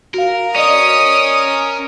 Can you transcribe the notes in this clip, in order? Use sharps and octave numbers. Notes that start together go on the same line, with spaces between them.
F#4 A#4 F5
C#4 D5 D#5 D#6